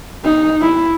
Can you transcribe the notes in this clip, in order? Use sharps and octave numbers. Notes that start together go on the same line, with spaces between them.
D#4
E4